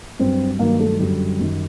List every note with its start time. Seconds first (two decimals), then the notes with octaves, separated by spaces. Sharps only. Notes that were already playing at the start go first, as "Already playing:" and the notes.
0.19 G2 F#3 C4
0.59 G2 D#3 F#3 A#3
0.80 A3
1.00 F#2 D3 F#3 G3
1.40 F#2 D#3 G3